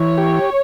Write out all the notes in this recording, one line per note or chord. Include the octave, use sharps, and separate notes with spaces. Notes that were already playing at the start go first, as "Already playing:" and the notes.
Already playing: E3 C#5
G4